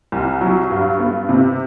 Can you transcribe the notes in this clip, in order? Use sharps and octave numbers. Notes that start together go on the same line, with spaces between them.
C2
F#3
G2
B3
C3